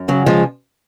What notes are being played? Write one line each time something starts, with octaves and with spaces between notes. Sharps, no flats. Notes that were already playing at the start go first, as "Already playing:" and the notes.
Already playing: F#2
C#3 F#3
F3 G#3